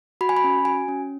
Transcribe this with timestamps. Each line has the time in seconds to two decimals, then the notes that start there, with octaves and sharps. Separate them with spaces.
0.21 F#4 B5
0.29 G#5
0.37 B5
0.44 C#4
0.65 F#4 G#5
0.88 C#4